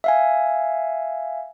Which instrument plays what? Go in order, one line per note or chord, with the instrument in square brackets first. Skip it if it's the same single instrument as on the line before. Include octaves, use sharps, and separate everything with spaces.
[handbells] E5 F5 G#5